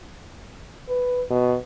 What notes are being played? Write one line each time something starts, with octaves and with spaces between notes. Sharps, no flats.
B4
B2